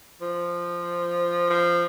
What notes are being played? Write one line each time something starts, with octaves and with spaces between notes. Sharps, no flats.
F3
F3